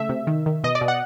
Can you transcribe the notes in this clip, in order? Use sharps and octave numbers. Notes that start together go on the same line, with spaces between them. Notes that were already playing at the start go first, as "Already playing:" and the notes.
Already playing: C#3 A3 E5
C3
D#3
D#3
B2 D#5
D5
B2
F#5